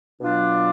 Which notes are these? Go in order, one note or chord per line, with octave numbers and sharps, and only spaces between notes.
B2 F#3 D4 F4